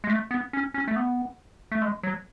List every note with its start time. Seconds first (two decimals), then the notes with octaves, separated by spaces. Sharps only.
0.04 G#3
0.09 A3
0.31 B3
0.53 C#4
0.74 C#4
0.88 A3
0.96 B3
1.72 A3
1.82 G#3
2.03 F#3